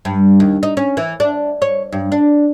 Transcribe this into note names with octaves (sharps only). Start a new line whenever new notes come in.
G2
D#2
D#4
C#4
E3
D4
C#5
G2
D4